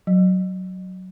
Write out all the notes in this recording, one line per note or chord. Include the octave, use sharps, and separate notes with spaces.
F#3